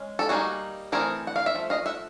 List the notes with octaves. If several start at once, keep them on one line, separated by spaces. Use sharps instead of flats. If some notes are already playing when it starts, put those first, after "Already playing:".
Already playing: G#3 C#4
A4
G3 A#3 D#4 F#4 G#4
E3 A3 C4 G#4 A#4
F#5
F5
E5
F3 A3
D#5 F5
E5 F#5